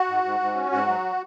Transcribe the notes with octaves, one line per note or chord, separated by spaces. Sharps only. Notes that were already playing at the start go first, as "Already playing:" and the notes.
Already playing: F#4
G#2
G#2
G#2
C#4
G#2 F#4
F#3